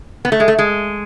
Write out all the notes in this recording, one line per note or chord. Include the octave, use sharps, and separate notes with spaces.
B3
A3
G#3
A3
G#3